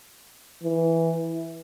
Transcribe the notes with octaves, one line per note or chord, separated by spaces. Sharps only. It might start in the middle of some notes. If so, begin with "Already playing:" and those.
E3